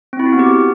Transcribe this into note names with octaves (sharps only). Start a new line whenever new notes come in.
C4
E4
F#4
B3
G4